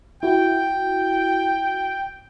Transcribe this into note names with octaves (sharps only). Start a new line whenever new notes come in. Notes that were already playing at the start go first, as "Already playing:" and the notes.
E4 F#4 G5